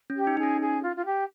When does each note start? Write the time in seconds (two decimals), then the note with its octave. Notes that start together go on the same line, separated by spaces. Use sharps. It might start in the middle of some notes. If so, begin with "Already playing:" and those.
0.10 C#4
0.16 G4
0.27 D#4
0.37 D#4 G#4
0.43 C#4
0.61 G#4
0.83 F4
0.96 F4
1.05 G4